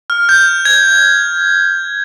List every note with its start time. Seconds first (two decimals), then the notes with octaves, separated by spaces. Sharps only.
0.10 F6
0.29 G6
0.65 G#6